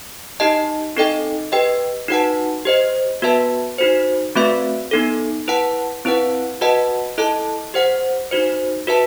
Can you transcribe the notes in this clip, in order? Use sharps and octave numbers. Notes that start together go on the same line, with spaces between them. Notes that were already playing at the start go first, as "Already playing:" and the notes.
D#4 G4 D#5 A5
C4 D#4 A4 D#5 G5
G4 B4 D#5 G5
D#4 F#4 B4 F#5 A5
G4 C5 D#5
B3 F#4 B4 E5 A5
D#4 F#4 C5
A3 C4 F#4 B4 E5
B3 D#4 A4
E4 B4 F#5 A5
C4 E4 B4 F#5
F#4 B4 D#5 F#5 A5
E4 A4 D#5 A5
G4 C5 F#5
D#4 F#4 C5
F#4 B4 E5 A5